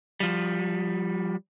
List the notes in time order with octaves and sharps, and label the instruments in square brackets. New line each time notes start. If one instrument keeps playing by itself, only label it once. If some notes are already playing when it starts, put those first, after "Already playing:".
[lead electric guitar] F3 G3